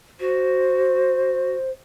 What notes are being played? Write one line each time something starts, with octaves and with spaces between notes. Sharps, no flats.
F#4 C5